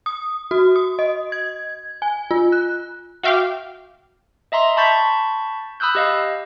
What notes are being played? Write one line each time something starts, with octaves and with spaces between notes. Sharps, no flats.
D#6
F#4
D#6
D#5
G#6
G#5
F4
F#6
F#4 E5 F5 G5 D6 F6
D#5 E5 A#5 C6
A5 B5 C#6 G6 A6 B6
B5 D#6 E6 F#6 G6
G4 D#5 F5